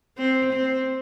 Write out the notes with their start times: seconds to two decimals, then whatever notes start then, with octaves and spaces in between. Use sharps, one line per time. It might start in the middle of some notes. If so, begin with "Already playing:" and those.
0.18 C4
0.54 C4